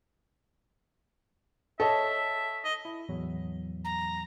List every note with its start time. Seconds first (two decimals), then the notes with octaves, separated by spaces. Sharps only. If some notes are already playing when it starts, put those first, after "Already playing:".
1.80 A4 C#5 D#5 E5
2.64 D#5
2.85 E4
3.09 E2 A2 F#3
3.85 A#5